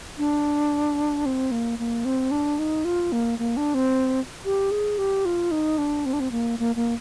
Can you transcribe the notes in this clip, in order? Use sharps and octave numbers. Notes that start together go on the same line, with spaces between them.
D4
C4
A#3
A#3
C4
D4
D#4
F4
A#3
A#3
D4
C4
G4
G#4
G4
F4
D#4
D4
C4
D4
C4
A#3
A#3
A#3